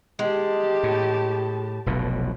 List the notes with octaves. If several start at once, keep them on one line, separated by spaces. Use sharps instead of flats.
G#3 G4 A5
A2
F1 B1 B2